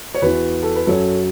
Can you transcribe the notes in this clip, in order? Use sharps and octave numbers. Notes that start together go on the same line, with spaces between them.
C#5
E2 E3 F#4 B4
A4
B4
F#2 F#3 A4 C#5